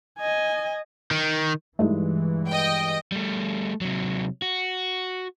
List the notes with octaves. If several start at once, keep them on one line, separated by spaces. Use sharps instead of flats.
D#5 G#5
D#3
G2 E3 G#3 A3 D#4 E4
D#5 G5
G3 A3
C3 F#3
F#4